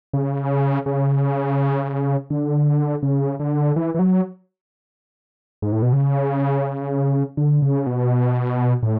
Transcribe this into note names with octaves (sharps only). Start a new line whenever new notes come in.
C#3
C#3
D3
C#3
D3
E3
E3
F#3
G#2
A2
B2
C#3
D3
C#3
B2
A2